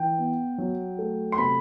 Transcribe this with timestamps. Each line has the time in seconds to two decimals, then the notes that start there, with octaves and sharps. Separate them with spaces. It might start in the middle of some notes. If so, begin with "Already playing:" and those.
Already playing: E3 G5
0.18 B3
0.58 F#3
0.99 A3
1.32 C6
1.38 C3 B5